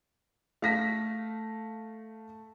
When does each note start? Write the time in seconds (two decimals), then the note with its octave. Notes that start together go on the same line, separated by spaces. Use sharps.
0.62 A3 F5 A#6 B6